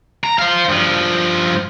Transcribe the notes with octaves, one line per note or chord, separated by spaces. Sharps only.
A#5
C5 F5
G2 F3